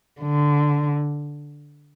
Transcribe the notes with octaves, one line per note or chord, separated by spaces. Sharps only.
D3